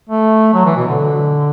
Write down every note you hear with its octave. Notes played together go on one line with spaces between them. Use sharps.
A3
F#3
E3
B2
D3